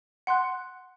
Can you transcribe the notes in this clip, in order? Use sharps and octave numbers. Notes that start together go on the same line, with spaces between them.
F#5 C6 F#6